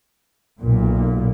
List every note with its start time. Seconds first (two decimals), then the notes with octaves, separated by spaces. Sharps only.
0.60 B1 A#2